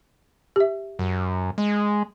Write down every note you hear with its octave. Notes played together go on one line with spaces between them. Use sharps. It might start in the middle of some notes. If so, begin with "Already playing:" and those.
G4 E5
F#2
G#3